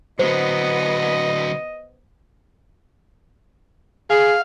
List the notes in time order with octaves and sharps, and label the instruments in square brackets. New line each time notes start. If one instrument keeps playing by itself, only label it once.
[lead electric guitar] D3 F#3 [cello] B3 [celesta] C5 [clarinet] D#5
[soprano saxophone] G#4 [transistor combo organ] F5